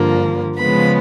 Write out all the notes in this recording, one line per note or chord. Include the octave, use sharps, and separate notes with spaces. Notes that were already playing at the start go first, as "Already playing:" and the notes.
Already playing: G2 D3 F3 A#3
C#3 F3 G#3 B3 B5